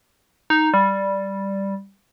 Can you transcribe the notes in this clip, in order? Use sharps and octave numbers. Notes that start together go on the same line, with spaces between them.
D#4
G3